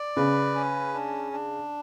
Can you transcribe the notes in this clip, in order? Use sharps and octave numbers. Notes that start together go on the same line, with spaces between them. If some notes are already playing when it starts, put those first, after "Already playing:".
Already playing: D5
C#3 B4
C#4
D4
D4